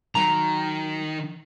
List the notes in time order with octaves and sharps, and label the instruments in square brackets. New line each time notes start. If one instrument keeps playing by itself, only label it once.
[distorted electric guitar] D#3 [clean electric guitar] F#3 A#5